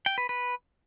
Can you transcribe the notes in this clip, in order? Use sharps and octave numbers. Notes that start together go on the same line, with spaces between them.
G5
B4
B4